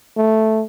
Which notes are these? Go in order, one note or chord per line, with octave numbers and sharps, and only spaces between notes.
A3